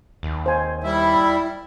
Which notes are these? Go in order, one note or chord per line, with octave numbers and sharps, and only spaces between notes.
D#2
C5 G#5
G3 E4